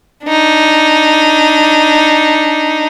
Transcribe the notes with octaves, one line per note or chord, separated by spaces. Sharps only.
D4 D#4